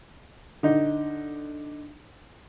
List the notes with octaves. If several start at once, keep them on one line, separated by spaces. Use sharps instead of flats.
D3 D#4